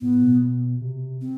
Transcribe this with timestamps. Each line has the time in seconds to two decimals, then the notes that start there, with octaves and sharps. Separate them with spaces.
0.01 A2 B3
0.22 B2
0.81 C3
1.21 C4